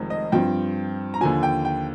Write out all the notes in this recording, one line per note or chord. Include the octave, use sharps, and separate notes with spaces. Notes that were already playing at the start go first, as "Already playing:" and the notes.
Already playing: F1 F2 D#3 G#3
D#5
G2 F3 C4 G5
A#5
D#2 D3 F3 G#5
G5
G5